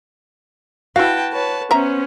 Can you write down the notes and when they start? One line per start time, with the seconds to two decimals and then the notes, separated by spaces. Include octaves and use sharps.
0.96 E4 F#4 B4 F5 G5 A5
1.32 B4 C#5 A5
1.71 B3 C#4 C5 E5 A#5